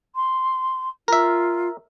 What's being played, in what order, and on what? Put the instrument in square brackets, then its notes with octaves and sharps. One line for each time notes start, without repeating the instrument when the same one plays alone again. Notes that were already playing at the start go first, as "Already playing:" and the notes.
[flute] C6
[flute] F4 [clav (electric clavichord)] A#4 E5